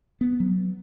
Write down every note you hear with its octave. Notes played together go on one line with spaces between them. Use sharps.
B3
F#3